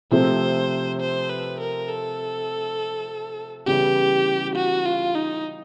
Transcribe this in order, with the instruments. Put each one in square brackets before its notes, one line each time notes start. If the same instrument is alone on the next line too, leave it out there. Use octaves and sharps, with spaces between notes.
[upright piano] C3 F3 A3 C4 [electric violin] C5
[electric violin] C5
B4
A#4
A4
[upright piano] C#3 E3 G3 B3 E4 [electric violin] G4
[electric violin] F#4
F4
D#4